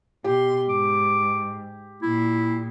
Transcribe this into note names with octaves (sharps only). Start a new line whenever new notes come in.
B2 G4 C6
G#2 D6
A#2 E4